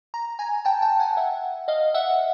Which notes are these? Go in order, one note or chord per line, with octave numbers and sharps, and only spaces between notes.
A#5
G#5 A#5
G5 A5
G5 A5
F#5 G#5
E5 F#5
D#5 F5
E5 F#5